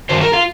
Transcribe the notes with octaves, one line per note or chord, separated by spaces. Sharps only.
G2 D#3 F#3 C5
A#4
F4